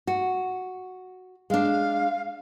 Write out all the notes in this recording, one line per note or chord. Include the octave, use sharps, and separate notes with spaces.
F#4
G#3 D4 F5